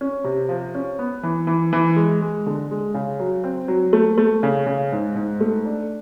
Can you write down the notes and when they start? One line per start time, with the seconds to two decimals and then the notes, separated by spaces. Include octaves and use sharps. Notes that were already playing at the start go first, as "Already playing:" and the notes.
0.01 C#4
0.24 C3
0.49 F3
0.74 C#4
0.99 B3
1.23 E3
1.47 E3
1.73 E3
1.96 G#3
2.21 G#3
2.46 D3
2.71 G#3
2.94 C#3
3.20 F#3
3.44 C4
3.68 F#3
3.93 A3
4.18 A3
4.43 C#3
4.66 C#3
4.92 G#2
5.16 G#2
5.41 A3
5.65 D4